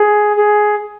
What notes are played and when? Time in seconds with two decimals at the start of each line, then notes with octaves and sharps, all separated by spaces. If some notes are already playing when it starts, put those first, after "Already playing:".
Already playing: G#4
0.37 G#4